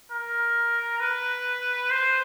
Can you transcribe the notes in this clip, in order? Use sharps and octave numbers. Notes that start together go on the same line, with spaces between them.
A#4
B4
C5